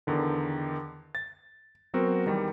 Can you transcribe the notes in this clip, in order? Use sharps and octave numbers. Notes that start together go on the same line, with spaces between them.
E2 D3 D#3
A6
F#3 B3 C4 F#4 A#4
E2 D#3 G3